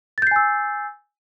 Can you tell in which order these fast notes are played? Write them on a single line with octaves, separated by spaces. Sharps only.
A6 G6 C7 G#5 E6